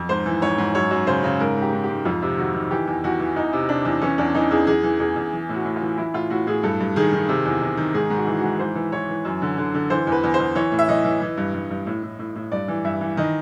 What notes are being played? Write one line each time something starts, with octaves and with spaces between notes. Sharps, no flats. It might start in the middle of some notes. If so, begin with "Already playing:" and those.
Already playing: F2
G#2 C5
E3
G#2 C#5
G#2
F#2 C#5
F#2
C#3 C5
C#3
G#2 A#4
G#2
G4
G#2
G4
G#2
F2 F4
C3
D#3 F#4
D#3
E3 G4
E2
E2 F#4
E3
E2 D#4
C3
C3 D4
E2
E3 C#4
E2 D4
E3 D#4
E2 G#4
E2 G#4
E3
E2 G#4
E2
E3
A2
F#4
A2
F4
E3
E3 E4
A2 F4
A2 F#4
A2 G#4
G2 A4
G2
D#3 G#4
D#3
C3
E2
E2
D#3
G#2 G#4
G#2
F#4
E3
F#4
G#2
E3 C5
E3
E3 C#5
E3
F#2
D3
D3
D3
E3 C5
E2
B4
E2
C5
E2
E3 C#5
A2
E5
E3 D#5
E3
E3
G2
G2
G2
A2
A2
A2
A2
G2 D5
E3
G2 E5
E3
D#3 D#5